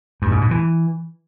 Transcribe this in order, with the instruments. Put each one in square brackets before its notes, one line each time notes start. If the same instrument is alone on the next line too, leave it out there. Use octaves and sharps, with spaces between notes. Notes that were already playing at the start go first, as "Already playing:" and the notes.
[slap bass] G2
G#2
B2
E3